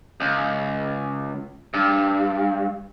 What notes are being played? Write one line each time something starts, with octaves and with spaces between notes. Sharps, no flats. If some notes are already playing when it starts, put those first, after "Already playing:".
C#2
G2